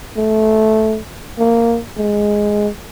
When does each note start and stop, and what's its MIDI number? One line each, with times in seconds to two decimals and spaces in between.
0.17 0.98 57
1.39 1.79 58
1.98 2.68 56